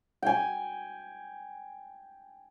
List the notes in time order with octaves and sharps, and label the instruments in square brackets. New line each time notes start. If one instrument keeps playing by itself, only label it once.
[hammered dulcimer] G5 G#5